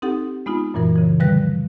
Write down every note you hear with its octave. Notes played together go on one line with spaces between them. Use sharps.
C4 D#4 G4 A4 F#5
G#3 B3 D#4 F4
F#2 A#2 E3 A#4
C#3 E3
D3 F3 G3 B4 F#6 A#6